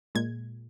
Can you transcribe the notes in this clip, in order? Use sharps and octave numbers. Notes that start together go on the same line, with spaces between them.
A#2 G#3 G#6